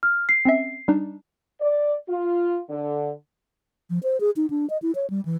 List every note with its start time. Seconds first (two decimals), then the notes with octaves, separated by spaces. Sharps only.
0.03 F6
0.29 C7
0.45 C4 C#4 E5
0.88 G3 D4 D#4
1.61 D5
2.09 F4
2.70 D3
3.90 F3
4.03 C5
4.20 G#4
4.36 D#4
4.50 D4
4.70 D#5
4.82 E4
4.95 C#5
5.10 G3
5.25 E3